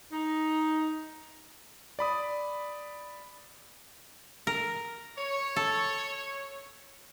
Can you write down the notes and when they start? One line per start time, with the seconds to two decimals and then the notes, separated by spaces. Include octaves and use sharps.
0.12 D#4
1.99 D5 B5 D#6
4.47 A#4
5.19 C#5
5.56 A4